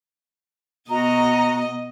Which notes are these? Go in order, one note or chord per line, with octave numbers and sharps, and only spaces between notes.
B2 F#4 D#5 A#5